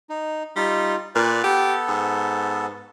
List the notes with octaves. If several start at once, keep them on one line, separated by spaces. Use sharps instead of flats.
D#4
G3 D#4 F4
A#2 B4 D5 F5
B3 G4 A4
G#2